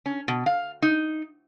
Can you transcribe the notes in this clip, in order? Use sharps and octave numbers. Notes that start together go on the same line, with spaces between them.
C#4
B2
F5
D#4